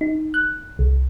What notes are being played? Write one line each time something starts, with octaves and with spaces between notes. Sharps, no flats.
D#4
F#6
C2